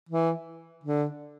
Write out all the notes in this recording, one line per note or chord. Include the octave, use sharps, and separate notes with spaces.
E3
D3